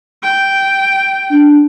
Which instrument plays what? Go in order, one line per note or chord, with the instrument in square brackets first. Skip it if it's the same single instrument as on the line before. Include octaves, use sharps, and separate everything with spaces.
[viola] G5
[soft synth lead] D4